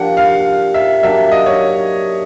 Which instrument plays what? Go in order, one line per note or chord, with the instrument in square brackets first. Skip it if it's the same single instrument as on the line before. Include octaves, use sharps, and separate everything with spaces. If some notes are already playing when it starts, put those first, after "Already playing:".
Already playing: [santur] F3 A#3 C4 D4 G4 [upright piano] F#5
[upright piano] F5
E5
[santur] F#3 A#3 D4 G4 [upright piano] E5
[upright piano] D#5
C#5